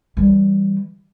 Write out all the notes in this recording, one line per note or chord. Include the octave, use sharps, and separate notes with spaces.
E3 G3